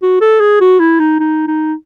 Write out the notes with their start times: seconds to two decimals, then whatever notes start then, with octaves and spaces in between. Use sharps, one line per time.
0.02 F#4
0.21 A4
0.41 G#4
0.60 F#4
0.79 E4
0.99 D#4
1.19 D#4
1.47 D#4